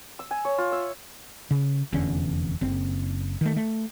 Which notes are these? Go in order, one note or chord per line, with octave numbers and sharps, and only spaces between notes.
E6
G#5
C#5
F4
E5
C#3
F1 E2 D3 C#4
F#1 C4
D#3 A3
A3